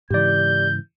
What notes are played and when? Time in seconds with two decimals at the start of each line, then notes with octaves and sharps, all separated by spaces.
0.10 G#2 C#3 E3 G4 D5 G6